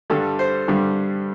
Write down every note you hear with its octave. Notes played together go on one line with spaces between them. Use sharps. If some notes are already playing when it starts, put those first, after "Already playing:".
G2 D3 G3 A4
C5
G2 D3 G3